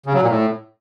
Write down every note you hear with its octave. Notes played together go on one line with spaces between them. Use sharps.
C#3
F#3
A#2
A2